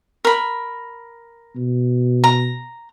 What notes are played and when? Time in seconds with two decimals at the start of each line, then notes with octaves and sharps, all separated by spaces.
0.25 A#4 B5
1.56 B2
2.24 A#5